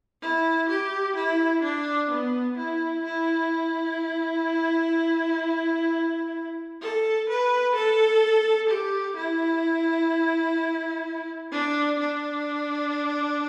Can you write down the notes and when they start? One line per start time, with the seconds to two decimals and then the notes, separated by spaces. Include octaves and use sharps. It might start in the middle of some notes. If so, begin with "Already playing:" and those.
0.22 E4
0.69 G4
1.16 E4
1.63 D4
2.10 B3
2.58 E4
3.04 E4
6.82 A4
7.29 B4
7.75 A4
8.70 G4
9.17 E4
11.52 D4
11.99 D4